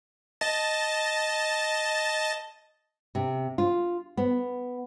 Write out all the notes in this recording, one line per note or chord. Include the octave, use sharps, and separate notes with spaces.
D#5 A5 A6
C3
F4
B3